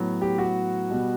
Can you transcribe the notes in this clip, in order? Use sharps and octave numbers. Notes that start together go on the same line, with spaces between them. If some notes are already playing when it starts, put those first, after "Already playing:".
Already playing: A2 F#3 B3
G4
F#4
B2 G3 B3